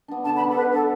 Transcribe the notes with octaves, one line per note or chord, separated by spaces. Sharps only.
B3 D4
D3 A5
B5
B3 D4
A4
D3 B4
B3 D4 A4